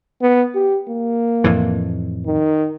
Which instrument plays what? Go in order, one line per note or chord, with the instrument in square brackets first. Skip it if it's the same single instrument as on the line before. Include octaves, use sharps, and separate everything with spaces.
[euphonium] B3
G4
A#3
[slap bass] F2 A2 E3
[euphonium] D#3